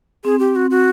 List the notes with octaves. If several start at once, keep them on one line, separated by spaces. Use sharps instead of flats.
C4 G#4
G4
F#4
F#4